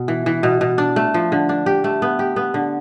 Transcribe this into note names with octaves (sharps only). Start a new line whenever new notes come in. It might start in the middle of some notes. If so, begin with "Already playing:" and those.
Already playing: B2
E3
E3
B2
B2
D4
A3
F3
D3
D4
G4
A3
B3
G4
B3
D3